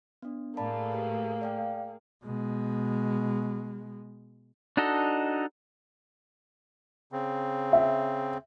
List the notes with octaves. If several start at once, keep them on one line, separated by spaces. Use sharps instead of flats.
B3 D4
A2 A3 A#3 G#4 D5 A5 B5
G4 B4
D5 F5 G5
B2 G#3
D4 D#4 F#4 A4 D#5
C#3 C4
E5